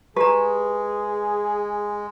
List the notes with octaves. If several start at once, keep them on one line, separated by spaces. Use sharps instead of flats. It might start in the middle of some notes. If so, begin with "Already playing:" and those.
G#3 G4 G#4 B4 A#5